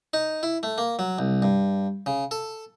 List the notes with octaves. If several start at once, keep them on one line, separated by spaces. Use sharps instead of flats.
D#4
E4
A3
A#3
F#3
C2
G2
C#3
A4